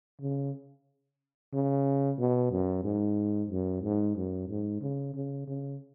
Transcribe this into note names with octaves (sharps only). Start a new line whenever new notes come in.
C#3
C#3
B2
F#2
G#2
F#2
G#2
F#2
G#2
C#3
C#3
C#3